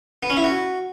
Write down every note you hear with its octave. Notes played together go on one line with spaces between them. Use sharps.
B3
C#4
E4
F#4